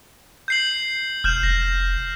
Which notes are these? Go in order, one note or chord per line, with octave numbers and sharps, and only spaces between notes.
G6 C7 F#7
E1 F6 G6 E7
F1 A#6